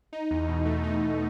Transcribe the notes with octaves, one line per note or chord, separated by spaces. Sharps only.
D#4
E2
B2
A3
D#4
E2